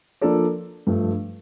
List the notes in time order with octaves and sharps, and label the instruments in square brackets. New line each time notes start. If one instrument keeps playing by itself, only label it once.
[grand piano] F3 A#3 D4 A4 D5
G2 F3 A3